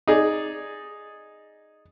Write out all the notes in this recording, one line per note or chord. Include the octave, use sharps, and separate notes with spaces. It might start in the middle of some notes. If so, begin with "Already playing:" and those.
D#4 G#4 D5